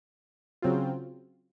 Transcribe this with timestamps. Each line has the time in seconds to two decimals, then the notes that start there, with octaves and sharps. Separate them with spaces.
0.62 C#3 F#3 C4 F4